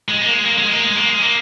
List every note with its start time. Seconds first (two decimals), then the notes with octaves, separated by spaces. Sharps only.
0.09 G#3
0.21 A#3
0.33 G#3
0.46 A#3
0.58 G#3
0.71 A#3
0.83 G#3
0.96 A#3
1.08 G#3
1.22 A#3